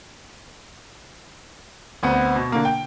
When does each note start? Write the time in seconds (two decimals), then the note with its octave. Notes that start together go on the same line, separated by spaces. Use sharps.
2.03 D2 B3 C4
2.36 B2
2.52 D3 A#3
2.65 G5